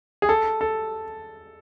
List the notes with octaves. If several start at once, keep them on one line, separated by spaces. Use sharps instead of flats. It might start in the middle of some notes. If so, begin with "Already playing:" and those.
G#4
A4
A4